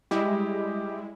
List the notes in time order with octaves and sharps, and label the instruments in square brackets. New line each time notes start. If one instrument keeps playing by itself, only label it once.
[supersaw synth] G3 G#3 E4 [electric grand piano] G4 D#5